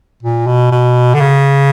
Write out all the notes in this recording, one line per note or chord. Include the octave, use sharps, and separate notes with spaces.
A#2
B2
B2
D3
C#3